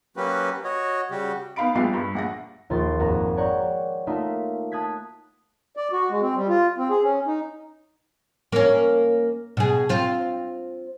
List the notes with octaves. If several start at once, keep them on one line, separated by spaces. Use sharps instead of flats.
F#3 A#3 C#4 F#4 G4 B4
F#4 C#5 D#5
C#3 G3 F#4 G4
B3 D#4 F5 B5 D7
A#1 G3 B3 F4 C7
G2
A#1 F#5 A#6
A#1 D#2 F4 C6 A6
G#1 F2 F#4 A#4 A#5
C#5 D5 F#5 G5 A#5 C#6
A3 A#3 D#4 F4 E5 F5
A5 D#6 F#6 G#6 B6
D5
F#4
G#3
C4
G3
F4
C4
G#4
C#4
D#4
A#3 C#4
B2 G#4
C4 F4